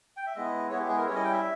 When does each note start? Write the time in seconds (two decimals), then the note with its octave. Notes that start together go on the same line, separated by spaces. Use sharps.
0.17 G5
0.27 E5
0.36 G#3 B3 E4 D#5
0.70 G#3 B3 E4 C#5
0.80 G4
0.88 G#4
0.97 A#4
1.05 G3 C#4 E4 C#5
1.15 D#5
1.24 G5
1.33 E5